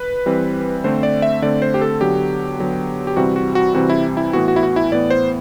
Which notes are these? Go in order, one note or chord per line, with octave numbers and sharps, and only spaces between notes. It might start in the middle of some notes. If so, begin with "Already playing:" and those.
Already playing: B4
E3 G3 C4
D3 A3 C4 C5
D5
E5
D3 A3 C4 D5
C5
G4
A4
D3 F#3 B3 G4
D3 F#3 B3
G4
C3 E3 G3 C4 F#4
F#4
F#4
C3 E3 G3 C4 F#4
E4
E4
A2 E3 B3 F#4
F#4
E4
F#4
E4
A2 E3 B3 D5
C5